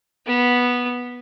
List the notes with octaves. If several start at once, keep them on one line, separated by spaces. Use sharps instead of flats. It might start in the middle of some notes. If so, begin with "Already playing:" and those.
B3